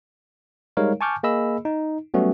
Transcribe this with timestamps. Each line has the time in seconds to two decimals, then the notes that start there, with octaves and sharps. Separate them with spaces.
0.77 G3 G#3 D#4 A#4 C#5 F5
1.01 G#5 A5 C#6 D6 F6 G6
1.23 A#3 G#4 D#5 B5 E6
1.65 D#4
2.14 F#3 G3 A3 B3 C#4 F#4